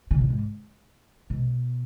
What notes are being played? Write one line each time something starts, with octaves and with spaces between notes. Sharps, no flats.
C#3
A#2
G#2
B2